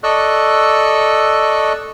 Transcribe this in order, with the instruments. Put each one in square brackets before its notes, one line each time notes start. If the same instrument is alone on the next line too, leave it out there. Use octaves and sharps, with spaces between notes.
[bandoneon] A4 D5 D#5 C#6 E6 F#6